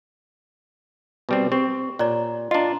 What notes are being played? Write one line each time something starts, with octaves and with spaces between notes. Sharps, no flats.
B2 G3 C4
C4 G4
A#2 C#5 D5 A#5
D4 F4 D#5 A#5